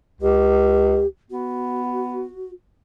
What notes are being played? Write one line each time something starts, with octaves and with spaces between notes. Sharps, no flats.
C#2 G4
B3 F#4